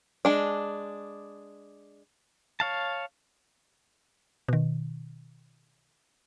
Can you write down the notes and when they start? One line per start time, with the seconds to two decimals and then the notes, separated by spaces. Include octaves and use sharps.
0.25 G#3 D4
2.60 C#5 F5 A5
4.48 B2 D#3